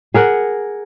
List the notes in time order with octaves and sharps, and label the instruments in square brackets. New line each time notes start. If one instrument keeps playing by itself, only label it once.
[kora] G#4 A#4 F#5